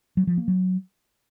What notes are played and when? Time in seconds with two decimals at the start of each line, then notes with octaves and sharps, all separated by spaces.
0.17 F#3
0.27 F3
0.38 A#3
0.48 F#3